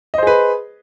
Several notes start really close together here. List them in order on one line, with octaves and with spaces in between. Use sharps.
D#5 C5 G#4 B4